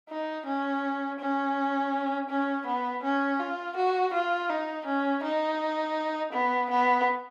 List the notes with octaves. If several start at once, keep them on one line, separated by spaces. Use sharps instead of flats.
D#4
C#4
C#4
C#4
B3
C#4
F4
F#4
F4
D#4
C#4
D#4
B3
B3